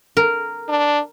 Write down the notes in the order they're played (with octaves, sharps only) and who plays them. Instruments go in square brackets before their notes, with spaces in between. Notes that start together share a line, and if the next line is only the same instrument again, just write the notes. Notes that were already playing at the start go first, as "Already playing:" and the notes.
[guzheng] A#4
[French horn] D4